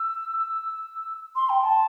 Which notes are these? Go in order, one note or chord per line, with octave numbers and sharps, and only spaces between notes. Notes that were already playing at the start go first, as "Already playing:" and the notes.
Already playing: E6
E6
C6
G5
A5